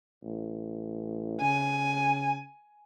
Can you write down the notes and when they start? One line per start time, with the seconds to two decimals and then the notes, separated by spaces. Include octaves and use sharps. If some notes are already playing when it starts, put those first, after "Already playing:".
0.23 A1
1.41 C#3 G#5